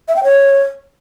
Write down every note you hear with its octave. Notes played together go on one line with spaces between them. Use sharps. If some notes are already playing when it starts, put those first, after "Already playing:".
E5
G5
C#5